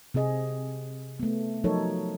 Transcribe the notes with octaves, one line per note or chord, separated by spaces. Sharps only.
C3 C4 G#4 D#5
A3 B3
F3 F#3 D#4 A4 A#4 C#5